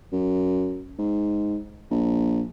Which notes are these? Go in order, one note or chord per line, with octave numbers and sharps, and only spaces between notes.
F#2
G#2
A#1